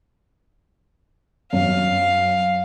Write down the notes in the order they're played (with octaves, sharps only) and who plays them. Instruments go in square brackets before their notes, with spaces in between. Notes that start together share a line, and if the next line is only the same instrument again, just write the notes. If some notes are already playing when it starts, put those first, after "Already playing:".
[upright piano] F#2 [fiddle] F5